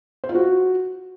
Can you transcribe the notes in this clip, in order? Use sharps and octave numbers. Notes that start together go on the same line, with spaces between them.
C5
F4
F#4